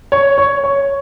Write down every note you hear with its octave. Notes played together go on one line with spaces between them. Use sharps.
C#5
C#5
C#5